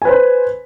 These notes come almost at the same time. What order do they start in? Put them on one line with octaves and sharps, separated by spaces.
G#5 B4 C5